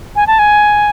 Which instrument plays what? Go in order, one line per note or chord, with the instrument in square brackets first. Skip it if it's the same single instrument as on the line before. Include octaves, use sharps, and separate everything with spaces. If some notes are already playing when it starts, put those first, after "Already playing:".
[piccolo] G#5
A5
G#5